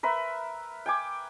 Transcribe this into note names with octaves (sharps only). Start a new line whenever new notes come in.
A#4 B4 E5 C6
G5 G#5 D6